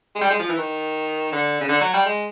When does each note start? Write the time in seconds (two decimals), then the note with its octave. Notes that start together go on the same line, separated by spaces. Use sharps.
0.15 G#3
0.21 G3
0.30 G#3
0.39 F3
0.49 E3
0.58 D#3
1.32 D3
1.61 C#3
1.68 D3
1.81 F#3
1.93 G3
2.06 G#3